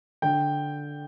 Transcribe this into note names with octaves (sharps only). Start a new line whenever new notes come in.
D3 G5